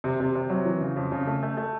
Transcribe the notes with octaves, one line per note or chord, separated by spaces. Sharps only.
C3
C3
C3
F#3
E3
C#3
F2
C#3
A3
A3
A3